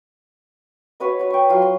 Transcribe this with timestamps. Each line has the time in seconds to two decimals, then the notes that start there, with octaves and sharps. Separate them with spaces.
1.00 F#4 B4 C#5 D#5
1.19 F#4 C#5
1.30 G5 C#6
1.49 F#3 F4 C6
1.62 F#4